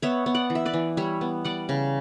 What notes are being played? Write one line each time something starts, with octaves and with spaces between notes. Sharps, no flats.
B3 C#5 E5
B3
D5 F#5
E3
E5
B4 D5
E3
G3 C#5 E5
B3
G3 D5 F#5
C#3